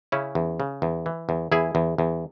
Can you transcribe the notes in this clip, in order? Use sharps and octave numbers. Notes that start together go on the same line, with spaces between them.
C#3 C#4 E4
E2
C#3
E2
E3
E2
E2 E4 G#4
E2
E2